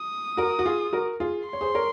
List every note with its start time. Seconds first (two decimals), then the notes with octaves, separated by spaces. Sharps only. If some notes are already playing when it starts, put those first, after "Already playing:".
Already playing: D#6
0.37 F#4 A#4
0.59 F#4
0.65 F4 G#4
0.93 F#4 A#4
1.20 F4 G#4
1.48 C6
1.53 C#5
1.61 G#4 C5
1.75 A#4 C#5